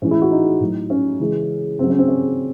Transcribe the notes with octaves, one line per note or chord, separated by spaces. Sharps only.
A2 E3 G#3 C#4
E4
F#4
D#4
A2 F#3
C#4
C#3 E3 G#3
C#3 F#3 C4
C#4
C4
C#4